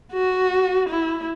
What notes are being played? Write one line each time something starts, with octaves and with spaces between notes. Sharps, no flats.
F#4
E4